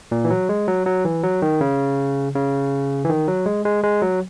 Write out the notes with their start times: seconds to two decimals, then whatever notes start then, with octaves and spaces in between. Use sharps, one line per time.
0.12 A#2
0.25 E3
0.30 F#3
0.49 G#3
0.68 F#3
0.86 F#3
1.05 E3
1.23 F#3
1.42 D#3
1.61 C#3
2.35 C#3
3.05 E3
3.09 D#3
3.28 F#3
3.46 G#3
3.65 G#3
3.84 G#3
4.02 F#3